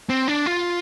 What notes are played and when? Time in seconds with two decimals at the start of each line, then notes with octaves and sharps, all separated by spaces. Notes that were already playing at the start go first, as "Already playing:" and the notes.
0.09 C4
0.28 D4
0.46 F4